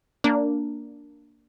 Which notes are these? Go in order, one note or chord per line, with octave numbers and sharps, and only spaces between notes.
A#3 D4